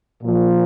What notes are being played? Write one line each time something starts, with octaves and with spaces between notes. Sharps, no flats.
A#2 F3